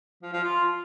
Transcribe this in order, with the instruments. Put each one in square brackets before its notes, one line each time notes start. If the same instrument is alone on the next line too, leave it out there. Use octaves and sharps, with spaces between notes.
[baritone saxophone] F3
F3
F4